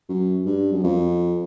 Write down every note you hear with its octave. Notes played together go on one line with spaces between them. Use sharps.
F#2
G2
F#2
F2